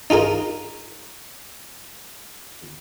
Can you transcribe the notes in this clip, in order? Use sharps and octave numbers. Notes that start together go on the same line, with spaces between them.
D#4 F4 G#4 A#4